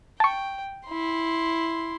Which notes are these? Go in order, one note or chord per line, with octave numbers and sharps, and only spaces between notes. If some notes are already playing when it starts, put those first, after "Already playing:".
G5 A5 C#6
E4 C6